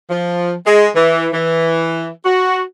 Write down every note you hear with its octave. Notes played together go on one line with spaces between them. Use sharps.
F3
G#3
E3
E3
F#4